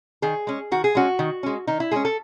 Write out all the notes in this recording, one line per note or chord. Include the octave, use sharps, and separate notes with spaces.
D#3 G#4
G#3 C#4
D#3 F#4
G#4
G#3 C#4 F#4
D#3
G#3 C#4
D#3 D#4
E4
G#3 C#4 G#4
A4